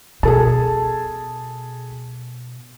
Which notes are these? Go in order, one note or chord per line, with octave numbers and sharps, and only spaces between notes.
B2 G#4 A4 A5